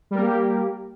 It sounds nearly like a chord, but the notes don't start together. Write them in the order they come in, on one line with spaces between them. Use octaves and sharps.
G3 A#4 A#3 G4